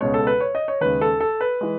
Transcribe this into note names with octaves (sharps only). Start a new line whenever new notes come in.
C#2 B2 G#3 C#5
A4
B4
C#5
D#5
C#5
D#2 C#3 G#3 B4
A4
A4
B4
E3 G#3